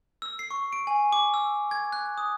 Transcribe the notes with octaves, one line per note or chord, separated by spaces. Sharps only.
E6
C7
C#6
D7
G#5
D6
E6
G#6
F#6
D#6